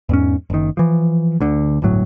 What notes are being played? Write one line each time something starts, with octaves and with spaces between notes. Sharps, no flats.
E2 G#2 C#4
F#1 D#3
E3 F3
D2 D3
G1 D2 A2 F#3